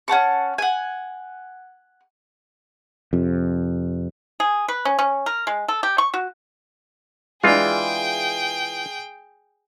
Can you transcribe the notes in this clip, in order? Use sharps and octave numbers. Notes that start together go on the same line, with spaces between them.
C#4 F#5 A5 C#6
F#5 G#5
F2 C3
G#4
B4
C#4
C#4
A#4
G#3
A4
G4
C#6
F#4
E3 G#3 D4 F4 G#4 G5